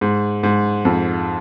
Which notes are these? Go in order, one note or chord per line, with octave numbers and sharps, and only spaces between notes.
G#2
G#2
F2